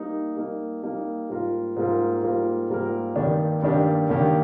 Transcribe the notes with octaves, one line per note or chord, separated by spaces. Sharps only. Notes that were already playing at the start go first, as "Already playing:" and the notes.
Already playing: G3 A#3 D#4
G3 A#3 D#4
G3 A#3 D#4
G#2 G3 A#3 F4 A#4
G#2 G3 A#3 F4 A#4
G#2 G3 A#3 F4 A#4
G#2 G3 A#3 F4 A#4
G2 D#3 A#3 D4 G4
G2 D#3 A#3 D4 G4
G2 D#3 A#3 D4 G4